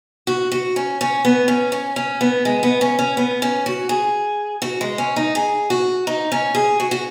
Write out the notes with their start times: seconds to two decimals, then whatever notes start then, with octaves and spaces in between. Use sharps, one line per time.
0.27 F#4
0.52 F#4
0.76 C#4
1.01 C#4
1.25 B3
1.48 C#4
1.72 C#4
1.96 C#4
2.21 B3
2.45 G#3
2.63 B3
2.81 C#4
2.99 C#4
3.17 B3
3.42 C#4
3.66 F#4
3.89 G#4
4.62 F#4
4.81 G#3
4.98 C#4
5.16 D#4
5.35 G#4
5.70 F#4
6.07 D#4
6.32 C#4
6.55 G#4
6.80 F#4
6.91 F#4